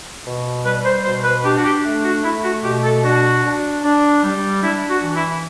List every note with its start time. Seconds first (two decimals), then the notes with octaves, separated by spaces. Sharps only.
0.25 B2
0.65 G3 B4
0.84 C5
1.04 B2 C5
1.24 B4
1.44 D4 G4
1.57 F#4
1.64 G4
1.84 A3
2.04 F#4
2.24 A3 E4
2.44 F#4
2.63 B2 G4
2.83 A4
3.03 D4 F#4
3.43 D4
3.83 D4
4.23 G3
4.63 D4 E4
4.89 F#4
5.03 E3
5.15 E4